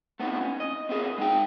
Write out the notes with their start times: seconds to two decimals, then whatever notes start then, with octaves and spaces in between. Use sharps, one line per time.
0.20 A3 B3 C4 D#4 E4
0.41 C#4
0.60 D#5
0.89 C4 E4 G#4 A#4
1.18 G#3 D#4 G5